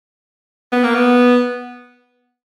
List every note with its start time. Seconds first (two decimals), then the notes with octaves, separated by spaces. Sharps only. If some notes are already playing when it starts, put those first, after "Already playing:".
0.72 B3
0.84 A#3
0.95 B3